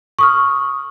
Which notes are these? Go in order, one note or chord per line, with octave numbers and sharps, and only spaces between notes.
C#6 D#6 F6